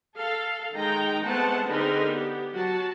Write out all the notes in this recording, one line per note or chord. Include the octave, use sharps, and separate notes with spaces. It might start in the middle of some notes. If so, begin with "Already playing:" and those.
A4 F5
D#3 G#3 D#4 G5 A#5
G#3 A3 B3 C4 F#5 A5
D3 C4 D#4 G#4 A#4 B4
B3 G4
F#3 F#4 A5